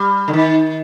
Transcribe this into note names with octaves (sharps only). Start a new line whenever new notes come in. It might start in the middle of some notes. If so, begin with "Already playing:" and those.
Already playing: G3
D3
D#3